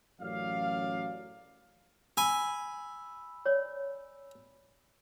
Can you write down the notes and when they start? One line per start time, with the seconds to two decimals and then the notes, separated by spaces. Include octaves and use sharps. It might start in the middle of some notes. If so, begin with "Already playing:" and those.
0.19 A1 F#2 F#3 D5 F5
2.17 G#5 B5 E6
3.46 C#5 D5